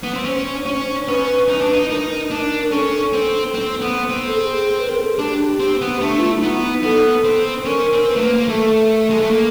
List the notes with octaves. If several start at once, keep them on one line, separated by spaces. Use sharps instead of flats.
B3
C4
C#4 C5
C#4
C#4 B4
D#4
D4
D#4
D#4 A#4
D4
A#4
C#4 A4
C4
C4
B3
C4
A4
G#4
B4
A#4
A4
G#4
D4 G4
C4
B3
A3 D4
F4
E4
B3 D#4
B3 A4
C4
C#4 A#4
C4
B4
A3
A#3
A#3
A3 A4
G#3
A3
A#3